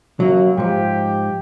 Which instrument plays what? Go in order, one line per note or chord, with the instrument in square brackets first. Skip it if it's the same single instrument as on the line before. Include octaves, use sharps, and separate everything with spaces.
[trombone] F#2 [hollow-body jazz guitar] F#3 A#3
[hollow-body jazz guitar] G#2 F3 [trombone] G4